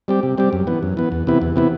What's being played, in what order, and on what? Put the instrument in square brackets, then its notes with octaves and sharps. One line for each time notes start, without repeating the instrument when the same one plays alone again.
[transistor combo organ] G3 C4 G4
C3
G3 C4 G4
F#2
E3 B3
F#2
E3 B3
E2
C3 E3 B3 E4
E2
C3 E3 B3 E4